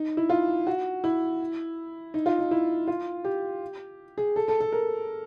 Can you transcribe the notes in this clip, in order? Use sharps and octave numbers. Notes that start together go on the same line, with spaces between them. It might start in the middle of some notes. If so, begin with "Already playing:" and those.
Already playing: D#4
E4
F4
F#4
E4
D#4
F4
D#4
E4
F4
G4
G#4
A4
A4
A4
A#4